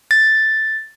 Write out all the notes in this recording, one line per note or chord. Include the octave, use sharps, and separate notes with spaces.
A6